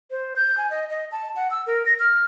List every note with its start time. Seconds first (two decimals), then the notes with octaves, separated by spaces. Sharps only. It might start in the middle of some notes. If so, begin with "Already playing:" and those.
0.11 C5
0.36 G6
0.58 G#5
0.70 D#5
0.90 D#5
1.12 A5
1.36 F#5
1.51 E6
1.67 A#4
1.86 A#6
1.99 F6